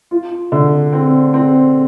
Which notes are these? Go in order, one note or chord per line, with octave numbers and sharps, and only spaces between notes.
F4
D3
C4
C4